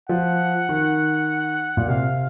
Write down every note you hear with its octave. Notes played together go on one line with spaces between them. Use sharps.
F3 F#5
D#3
A#2
C3 F5